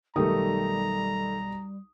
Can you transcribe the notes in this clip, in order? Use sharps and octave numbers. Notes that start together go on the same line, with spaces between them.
B1 D#3 G3 A3 G4 A#5 D#6